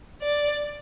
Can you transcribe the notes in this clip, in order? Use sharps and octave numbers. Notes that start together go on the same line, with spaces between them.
D5